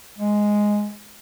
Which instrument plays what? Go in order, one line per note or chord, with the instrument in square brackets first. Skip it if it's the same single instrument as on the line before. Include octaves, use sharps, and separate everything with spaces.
[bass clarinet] G#3